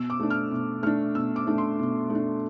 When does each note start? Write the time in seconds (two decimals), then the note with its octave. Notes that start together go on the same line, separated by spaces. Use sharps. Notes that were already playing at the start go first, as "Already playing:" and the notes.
Already playing: B2 E6
0.10 D6
0.20 A3 D4
0.30 F6
0.51 B2
0.83 A3 D4 F6
1.15 B2 E6
1.36 D6
1.47 A3 D4
1.58 C6
1.79 B2
2.10 A3
2.15 D4